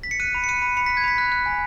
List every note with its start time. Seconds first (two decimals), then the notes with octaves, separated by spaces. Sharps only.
0.03 B6
0.11 C#7
0.20 F#6 D#7
0.35 B5
0.44 C#7
0.48 F#6 D#7
0.62 B5
0.77 B5 C#7
0.86 F#6 B6
0.97 G#6
1.04 B5 B6
1.18 F#6
1.32 F#6
1.46 G#5